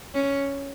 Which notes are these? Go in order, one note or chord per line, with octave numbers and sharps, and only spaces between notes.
C#4